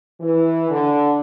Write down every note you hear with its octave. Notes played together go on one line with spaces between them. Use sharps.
E3
D3